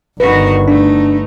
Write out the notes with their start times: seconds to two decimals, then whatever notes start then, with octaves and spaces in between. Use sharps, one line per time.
0.20 G1 D#3 F#4 B4
0.68 A3 D4 D#4